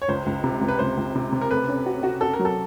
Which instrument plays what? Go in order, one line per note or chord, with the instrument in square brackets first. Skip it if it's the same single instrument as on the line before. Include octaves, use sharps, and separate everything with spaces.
[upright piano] C#5
[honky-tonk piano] C#2 [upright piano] C5
[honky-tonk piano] C#2
C3
C#2
[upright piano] B4
[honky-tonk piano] C#2 [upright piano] C5
[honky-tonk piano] C#2
C3
C3
[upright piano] A#4
[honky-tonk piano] A3 [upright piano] B4
[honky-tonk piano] C#4
F#4
F#4
[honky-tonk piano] F#4 [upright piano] A4
[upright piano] A#4
[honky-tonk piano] F#3
[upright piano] A4